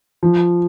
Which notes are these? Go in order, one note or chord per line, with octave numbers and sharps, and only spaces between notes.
F3